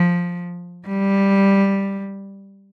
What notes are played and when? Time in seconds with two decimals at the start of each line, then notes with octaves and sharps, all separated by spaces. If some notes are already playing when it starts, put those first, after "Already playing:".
Already playing: F3
0.88 G3